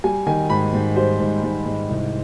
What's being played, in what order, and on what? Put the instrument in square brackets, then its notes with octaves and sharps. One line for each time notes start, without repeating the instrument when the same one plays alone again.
[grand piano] G3 G#5
D#3 G#5
G#2 B5
G#2
G3 C5
G#2
G#2
G#2
C2